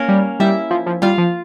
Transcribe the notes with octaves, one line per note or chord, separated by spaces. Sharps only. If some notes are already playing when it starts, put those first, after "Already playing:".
Already playing: A#3 C#4 A#4 C#5
G3
G3 E4 E5
F3
F3
G3 F4 F5
F3